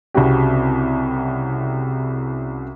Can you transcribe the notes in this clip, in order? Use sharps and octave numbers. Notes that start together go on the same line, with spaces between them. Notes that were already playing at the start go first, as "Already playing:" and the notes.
C2 C#3 C4 F#4 G4